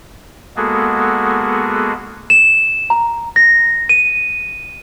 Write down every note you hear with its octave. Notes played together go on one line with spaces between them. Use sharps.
G#3 A#3 B3 F#4 G#4 A4
E7
A#5
A#6
D#7